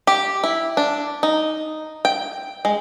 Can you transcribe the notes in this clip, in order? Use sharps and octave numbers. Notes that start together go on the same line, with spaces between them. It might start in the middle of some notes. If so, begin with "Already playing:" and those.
G4
E4
D4
D#4
G5
G#3